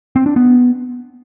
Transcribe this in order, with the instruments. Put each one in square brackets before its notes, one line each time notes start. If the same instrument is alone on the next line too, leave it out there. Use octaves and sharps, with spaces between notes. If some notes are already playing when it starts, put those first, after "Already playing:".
[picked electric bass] C4
D4
B3